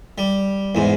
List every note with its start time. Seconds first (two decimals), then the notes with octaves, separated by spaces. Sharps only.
0.18 G3
0.75 E2 G#2